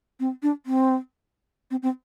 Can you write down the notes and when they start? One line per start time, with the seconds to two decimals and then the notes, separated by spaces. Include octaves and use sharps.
0.20 C4
0.43 D4
0.66 C4
1.71 C4
1.83 C4